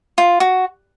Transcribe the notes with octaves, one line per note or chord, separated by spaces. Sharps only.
F4
F#4